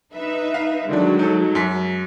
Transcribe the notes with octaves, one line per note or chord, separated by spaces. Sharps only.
D#4 B4 E5
F5
D3 D#3 F#3 G#3 D4
D#4 A4
F#2 B6